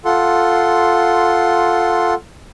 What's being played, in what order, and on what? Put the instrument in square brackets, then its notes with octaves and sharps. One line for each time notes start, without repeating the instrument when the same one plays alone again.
[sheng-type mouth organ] F4 A4 F#5 C6